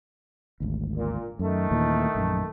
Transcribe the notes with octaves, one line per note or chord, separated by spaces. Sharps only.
G#1 D2
A#2
F#2 D#3 A3
D#2 A#2 E3
A#1 F#2